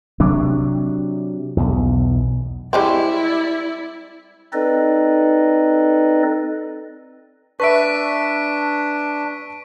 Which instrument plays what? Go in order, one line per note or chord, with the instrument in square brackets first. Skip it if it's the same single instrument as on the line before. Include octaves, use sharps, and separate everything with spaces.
[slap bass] C3 F#3 D4
B1 E2
[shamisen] G3 G#3 C4 [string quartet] E4 D5
[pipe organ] C4 D#4 A4 B4 D5 D#5
[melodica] D4 [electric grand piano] B4 E5 [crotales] C#6 B6 D7